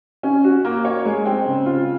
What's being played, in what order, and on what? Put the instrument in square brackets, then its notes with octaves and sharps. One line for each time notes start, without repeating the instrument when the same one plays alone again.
[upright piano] C#4
F#4
A#3
C#5
G#3
C4
C#3
F4